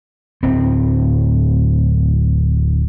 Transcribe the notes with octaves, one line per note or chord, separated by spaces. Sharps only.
D1 C4